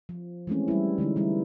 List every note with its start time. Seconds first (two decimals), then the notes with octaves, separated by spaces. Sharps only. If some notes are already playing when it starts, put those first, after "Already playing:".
0.09 F3
0.47 E3 G#3 A3 C4 C#4
0.68 G3 E4
0.98 D3 E3 G#3 D#4
1.16 E3 G3 E4